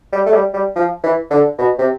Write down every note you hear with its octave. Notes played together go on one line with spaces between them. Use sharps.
G3
A3
G3
G3
F3
E3
D3
B2
C3